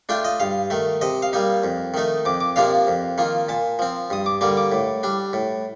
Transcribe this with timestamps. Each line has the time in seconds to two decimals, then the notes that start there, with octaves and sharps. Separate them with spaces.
0.09 A3 D4 F4 G5
0.25 D#5
0.40 G2 F5
0.70 D#3 A3
1.01 C3 D#5
1.22 F5
1.33 G3 A#3 D#4
1.64 F2
1.94 D#3 A3 D#4
2.25 F2 D6
2.41 D6
2.56 C3 F3 A#3 D4 F5
2.87 F2
3.18 D#3 A#3 F4
3.49 A#2 A5
3.79 F3 C4
4.10 G2 D#6
4.26 D6
4.41 D3 G3 A#3 D6
4.57 D6
4.72 A2
5.03 G3 D4
5.33 A2